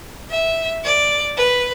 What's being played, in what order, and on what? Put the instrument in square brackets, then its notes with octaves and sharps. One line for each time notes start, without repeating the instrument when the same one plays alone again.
[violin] E5
D5
B4